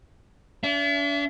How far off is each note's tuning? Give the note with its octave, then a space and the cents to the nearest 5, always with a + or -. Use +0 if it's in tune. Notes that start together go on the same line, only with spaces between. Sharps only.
D4 -40 E5 +30